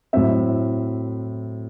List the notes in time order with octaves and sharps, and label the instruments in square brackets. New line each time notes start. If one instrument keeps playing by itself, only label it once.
[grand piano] A2 F#3 C4 E5